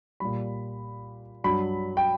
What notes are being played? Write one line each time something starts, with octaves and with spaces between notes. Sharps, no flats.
A#2 G3 B5
G2 F#3 B5
G5